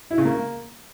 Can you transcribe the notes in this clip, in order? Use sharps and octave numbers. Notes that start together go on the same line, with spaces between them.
E4
C#3
A#3